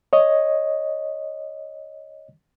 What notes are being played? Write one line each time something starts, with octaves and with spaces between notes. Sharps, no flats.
C#5 D#5